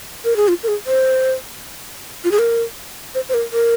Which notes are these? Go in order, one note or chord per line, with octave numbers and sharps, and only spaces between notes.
A#4
G#4
F4
A#4
G#4
C5
F4
G#4
A#4
C5
C5
A#4
A#4